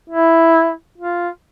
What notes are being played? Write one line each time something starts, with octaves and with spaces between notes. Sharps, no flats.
E4
F4